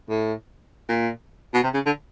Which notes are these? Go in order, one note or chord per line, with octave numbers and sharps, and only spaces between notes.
A2
A#2
B2
C3
C#3
D3